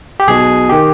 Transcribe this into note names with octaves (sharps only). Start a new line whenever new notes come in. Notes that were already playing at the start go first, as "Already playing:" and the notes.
G4
B1 B2 G#4
D#3 G4